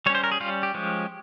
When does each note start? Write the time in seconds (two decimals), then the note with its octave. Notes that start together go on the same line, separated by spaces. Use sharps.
0.06 G3 C#5
0.10 C#4 C5
0.24 A#4
0.31 G#4
0.40 G3 C#4 F4
0.63 G4
0.74 F3 G#3 C#4